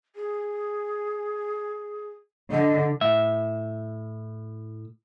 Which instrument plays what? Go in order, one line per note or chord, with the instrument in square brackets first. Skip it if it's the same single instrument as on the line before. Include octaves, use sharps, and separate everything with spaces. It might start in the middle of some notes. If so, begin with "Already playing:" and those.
[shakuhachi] G#4
[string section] D3 [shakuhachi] D#5
[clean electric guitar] A2 E5